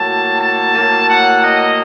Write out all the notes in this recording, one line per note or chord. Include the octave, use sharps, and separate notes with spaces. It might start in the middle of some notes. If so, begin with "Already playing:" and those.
Already playing: A2 F#3 A#3 A5
A5
A2 F#3 A#3
F#5
D#5